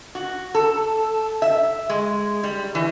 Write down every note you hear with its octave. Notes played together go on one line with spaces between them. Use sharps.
F#4
A4
E5
G#3
G3
E3